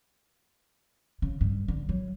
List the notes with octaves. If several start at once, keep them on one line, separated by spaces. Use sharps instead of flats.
C#3
G2
D3
F#3